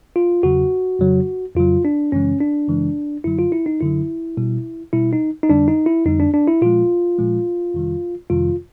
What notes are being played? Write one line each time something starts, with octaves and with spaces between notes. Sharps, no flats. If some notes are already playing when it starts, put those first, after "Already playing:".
F4
E2 C#3 F#3 F#4
F2 C#3 F#3
F2 C#3 F#3 F4
D4
F#2 C#3 E3 G#3 C#4
D4
F#2 C#3 E3 G#3
F#2 D3 F#3 E4
F4
E4
D#4
F#2 D3 F#3 E4
B2 G3
B2 G3 E4
D#4
D#4
F2 D3 G3 D4
D#4
E4
F2 D3 G3 D#4
D4
D4
E4
A#2 F3 G#3 F4
A#2 F3 G#3
F2 C3 D#3 G3
F2 C3 D#3 G3 F4